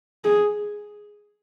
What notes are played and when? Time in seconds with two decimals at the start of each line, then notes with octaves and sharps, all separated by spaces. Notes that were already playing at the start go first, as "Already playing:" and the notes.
0.24 G#4